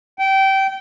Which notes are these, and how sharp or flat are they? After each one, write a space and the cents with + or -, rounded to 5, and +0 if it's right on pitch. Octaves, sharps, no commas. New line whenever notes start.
G5 -20